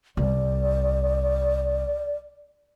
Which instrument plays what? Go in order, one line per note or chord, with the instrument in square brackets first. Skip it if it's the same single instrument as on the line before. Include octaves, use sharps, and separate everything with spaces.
[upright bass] C2 [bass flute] D5